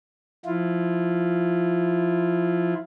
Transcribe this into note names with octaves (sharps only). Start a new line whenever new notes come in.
F3 E4 F4